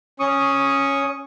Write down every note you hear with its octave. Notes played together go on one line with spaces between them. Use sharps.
C#4 C#6 D#6